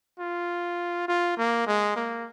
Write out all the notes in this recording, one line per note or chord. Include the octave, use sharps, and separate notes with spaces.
F4
F4
A#3
G#3
A#3